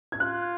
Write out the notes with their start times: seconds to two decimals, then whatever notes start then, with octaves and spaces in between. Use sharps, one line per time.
0.12 G#6
0.20 F4 F#6